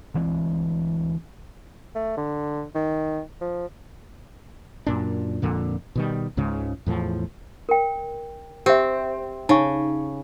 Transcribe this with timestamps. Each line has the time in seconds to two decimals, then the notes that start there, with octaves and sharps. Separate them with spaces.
0.14 D2 E3 G#3 C4
1.95 A3
2.17 D3
2.75 D#3
3.41 F3
4.87 F#2 A#2 D4
5.42 F2 A#2 D3
5.96 B2 D#3 G3
6.37 C#2 G#2 C#3
6.87 E2 A2 F3
7.69 A#4 G5
8.66 C4 G4 E5
9.49 C#3 D#4 C#6